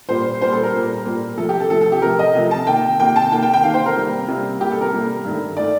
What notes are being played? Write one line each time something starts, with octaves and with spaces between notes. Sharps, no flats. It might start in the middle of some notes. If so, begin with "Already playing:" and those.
A#2 G3 A#3 C5
A#2 G3 A#3 C5
A4
A#4
A#2 G3 A#3
A#2 G3 A#3
C3 F3 A3 A4
G4
A4
C3 F3 A3 A4
A4
G4
C3 F3 A3 A#4
D#5
C3 F3 A3
A5
C3 D#3 A#3 G5
C3 D#3 A#3 G5
A5
C3 D#3 A#3 G5
G5
G5
C3 D#3 A#3 F5
C5
A#4
C3 G3 A#3
C3 G3 A#3
C3 G3 A#3 G4
A4
A#4
C3 G3 A#3
G2 D#3 A3
D#3 A3 D5